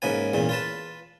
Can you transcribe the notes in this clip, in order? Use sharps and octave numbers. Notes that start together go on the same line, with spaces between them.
G#2 C#3 A#3 B4 G#5
E2 A#2 C#3
F4 B4 A5